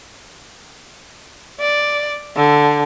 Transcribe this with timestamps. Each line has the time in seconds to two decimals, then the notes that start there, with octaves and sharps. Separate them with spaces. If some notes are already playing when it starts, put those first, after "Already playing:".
1.60 D5
2.36 D3